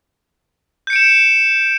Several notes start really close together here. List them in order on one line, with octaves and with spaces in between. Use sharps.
G6 C#7 D7 E7